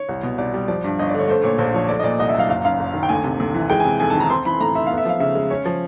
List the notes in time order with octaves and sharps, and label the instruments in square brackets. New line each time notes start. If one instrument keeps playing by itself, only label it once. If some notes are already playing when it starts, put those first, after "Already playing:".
Already playing: [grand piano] C#5
[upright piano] C2
B2
[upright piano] C2 [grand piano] D5
[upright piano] G3
[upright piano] F3 [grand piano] D5
[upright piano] G2
[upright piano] G1 [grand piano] D#5
[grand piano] D5
[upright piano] D3 [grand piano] C#5
[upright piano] A3 [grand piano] C5
[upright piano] A#2 [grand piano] C#5
[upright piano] A#1 [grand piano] C5
[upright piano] F3 [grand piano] C#5
[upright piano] A3 [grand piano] D5
[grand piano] D#5
[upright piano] A#2 [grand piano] D5
[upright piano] C2 [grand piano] D#5
[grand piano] E5
[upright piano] F#3 [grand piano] F5
[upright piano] F#1 [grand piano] F5
[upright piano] F#2 [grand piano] F5
[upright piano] F#1
D#3
[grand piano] G5
[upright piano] D2 [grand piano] G#5
[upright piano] C3
D2
E3
[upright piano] G#3 [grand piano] G5
[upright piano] C3 [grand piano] G#5
[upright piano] F2 [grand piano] G#5
[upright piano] D#3 [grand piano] A5
[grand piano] A#5
[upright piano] C4 [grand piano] C6
[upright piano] E3 [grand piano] B5
[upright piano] A2 [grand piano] A#5
[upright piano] A3 [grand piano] E5
[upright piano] B3 [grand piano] F5
[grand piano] E5
[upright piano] F3 [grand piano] F5
[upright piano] C#3 [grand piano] E5
[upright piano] G#3
[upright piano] C#4 [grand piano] C#5
[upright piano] F3